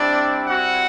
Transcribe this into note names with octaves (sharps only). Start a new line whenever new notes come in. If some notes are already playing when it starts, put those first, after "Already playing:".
Already playing: G3 C4 D4 E4 D5
F#4 F#5